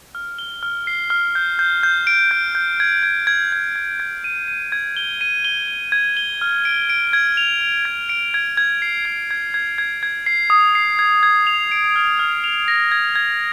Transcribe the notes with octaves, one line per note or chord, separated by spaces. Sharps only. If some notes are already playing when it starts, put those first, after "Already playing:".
F6
G7
F6
C7
F6
G6
G6
G6
D7
G6
G6
G#6
G#6
G#6
G#6
G#6
G#6
D#7
D#7
G#6
G7
D#7
G7
G7
G#6
G7
F6
D7
D7
G#6
F7
F7
G#6
D7
G#6
G#6
C7
G#6
G#6
G#6
G#6
G#6
C7
D#6
C7
G#6
G#6
F7
D7
F6
F6
F7
A#6
G#6
G#6